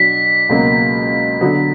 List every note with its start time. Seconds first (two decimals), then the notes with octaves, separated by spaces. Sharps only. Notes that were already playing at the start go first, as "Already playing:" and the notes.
Already playing: B2 F#3 D4 B6
0.49 C#2 B2 F#3 A#3
1.41 D3 F#3 B3